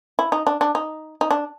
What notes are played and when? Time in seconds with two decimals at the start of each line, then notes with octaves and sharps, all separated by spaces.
0.19 E4
0.32 D#4
0.47 D4
0.61 D4
0.75 D#4
1.21 D#4
1.31 D4